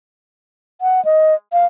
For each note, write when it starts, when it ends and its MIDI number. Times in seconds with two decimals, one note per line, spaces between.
0.81 1.04 78
1.05 1.35 75
1.53 1.66 77